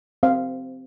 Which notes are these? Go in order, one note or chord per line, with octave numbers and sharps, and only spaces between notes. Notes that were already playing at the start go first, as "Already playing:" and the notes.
C4 F5